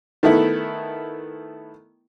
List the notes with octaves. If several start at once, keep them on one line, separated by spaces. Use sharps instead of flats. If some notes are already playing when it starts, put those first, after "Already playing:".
D#3 A3 B3 E4